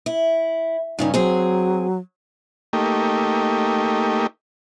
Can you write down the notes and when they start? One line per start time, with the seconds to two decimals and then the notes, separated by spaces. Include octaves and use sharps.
0.06 E4
0.99 G2 C#3 C#4 D#4
1.14 F#3 C4 G#4
2.73 A3 A#3 D#4 G4